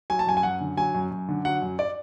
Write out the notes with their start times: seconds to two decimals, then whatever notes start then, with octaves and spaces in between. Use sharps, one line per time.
0.10 F#3 G#5
0.19 A5
0.27 F#2 G#5
0.37 G#5
0.43 F#2 F#5
0.61 D3
0.77 F#3 G#5
0.94 F#2
1.11 F#2
1.28 D3
1.45 F#3 F#5
1.62 F#2
1.79 D5